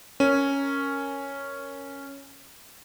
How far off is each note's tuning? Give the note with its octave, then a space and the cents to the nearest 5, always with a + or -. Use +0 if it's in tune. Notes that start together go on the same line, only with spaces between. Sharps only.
C#4 +0 A#4 +0